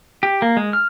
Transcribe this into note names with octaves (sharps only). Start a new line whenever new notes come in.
G4
A#3
G#3
F6